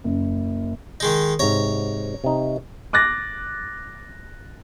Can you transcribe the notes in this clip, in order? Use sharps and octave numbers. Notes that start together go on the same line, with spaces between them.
F#1
D#3 G#3 D#4
G#2 C3 C#5 A#5
C3 D#4
D6 F#6 A6 A#6